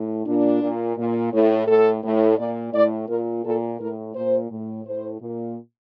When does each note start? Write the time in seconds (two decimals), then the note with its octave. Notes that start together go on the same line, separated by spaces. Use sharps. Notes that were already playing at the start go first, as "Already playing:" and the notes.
Already playing: A2
0.26 A#2 D4
0.62 A#2
0.97 A#2
1.33 A2
1.67 A2 A4
2.03 A2
2.38 A#2 D5
2.73 A2 D5
3.08 A#2 A#4
3.44 A#2 A4
3.79 A2 A#4
4.15 A#2 C5
4.50 A2
4.85 A2 C5
5.21 A#2